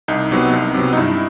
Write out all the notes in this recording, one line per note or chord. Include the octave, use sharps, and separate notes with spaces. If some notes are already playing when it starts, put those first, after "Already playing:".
C2 D#4
C3 F#3 B3
C2
C3 F#3 B3
D#4
G2 E4